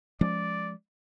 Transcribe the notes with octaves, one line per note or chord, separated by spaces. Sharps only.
F3 G#3 C#4 D5